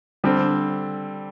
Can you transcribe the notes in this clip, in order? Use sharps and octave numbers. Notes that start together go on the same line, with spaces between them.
D3 G3 C4